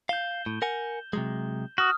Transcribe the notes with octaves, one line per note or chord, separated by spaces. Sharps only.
F5 G6 E7 G7
A2
A#4 F#5 G#5
C3 F#3 G#3
F#4 D#6 F6